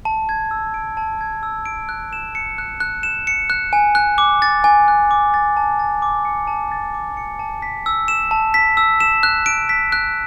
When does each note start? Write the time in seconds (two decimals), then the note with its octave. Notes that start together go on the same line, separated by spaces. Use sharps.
0.05 A5
0.29 G#6
0.51 E6
0.74 D7
0.97 A5
1.21 G#6
1.43 E6
1.66 D7
1.89 F#6
2.13 E7
2.35 C#7
2.58 F#6
2.80 F#6
3.03 E7
3.27 C#7
3.50 F#6
3.73 G#5
3.95 F#6
4.18 D6
4.42 A6
4.64 G#5
4.88 F#6
5.11 D6
5.34 A6
5.57 A5
5.79 A6
6.02 D6
6.25 C#7
6.47 A5
6.72 A6
6.94 D6
7.17 C#7
7.39 A5
7.62 B6
7.86 E6
8.08 E7
8.31 A5
8.54 B6
8.77 E6
9.00 E7
9.23 F#6
9.46 D7
9.69 B6
9.92 F#6